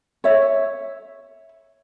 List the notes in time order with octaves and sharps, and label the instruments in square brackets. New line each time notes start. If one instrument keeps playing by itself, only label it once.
[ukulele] C#5 E5